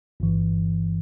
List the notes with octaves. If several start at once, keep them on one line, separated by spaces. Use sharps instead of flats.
G1 G2 E3